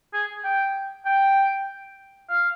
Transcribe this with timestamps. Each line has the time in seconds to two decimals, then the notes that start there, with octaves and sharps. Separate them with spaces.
0.13 G#4
0.44 G5
1.06 G5
2.29 F5